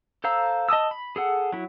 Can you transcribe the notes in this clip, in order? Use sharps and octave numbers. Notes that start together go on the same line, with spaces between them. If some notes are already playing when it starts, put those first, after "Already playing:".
A4 C5 F5 A#5 E6
D#5 A5 D#6 E6
B5
G#4 A4 F#5
F#3 E4